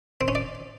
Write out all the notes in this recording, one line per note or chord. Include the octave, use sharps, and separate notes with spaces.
C4
C#4
D5